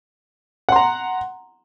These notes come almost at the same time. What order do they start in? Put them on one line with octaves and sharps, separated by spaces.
F#5 C6 A#5